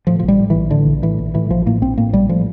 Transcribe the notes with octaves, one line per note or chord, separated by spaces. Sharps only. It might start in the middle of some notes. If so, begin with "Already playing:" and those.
A2 F3
F3
A#1
G3
A2
A#1 E3
A2 D3
A#1
A2 E3
A#1
A2 E3
A#1 F3
A2 A#3
A#1 C4
A2 A#3
A#1 G3
A2 F3